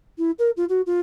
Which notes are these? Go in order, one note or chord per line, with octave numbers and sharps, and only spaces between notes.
E4
A#4
F4
F#4
F4